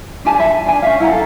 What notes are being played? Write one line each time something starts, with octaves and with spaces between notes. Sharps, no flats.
D4 G4 G#5 A5
E5 B5
D4 G#5
C#4 C5 E5 F5
E4 F#5 A#5
A4 F5